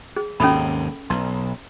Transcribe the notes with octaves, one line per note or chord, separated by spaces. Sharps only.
G#4
D#2 G#2 C3 C#4 A4 B5
B1 C6